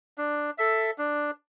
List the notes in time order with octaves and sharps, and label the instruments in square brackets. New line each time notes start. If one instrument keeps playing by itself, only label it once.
[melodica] D4
A4 E5
D4